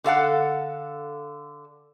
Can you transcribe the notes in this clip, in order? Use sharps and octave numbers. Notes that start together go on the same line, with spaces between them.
D3 A4 F5 F#5